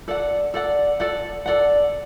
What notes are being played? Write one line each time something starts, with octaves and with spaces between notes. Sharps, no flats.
A4 D5 F#5
A4 D5 F#5
A4 D5 F#5
A4 D5 F#5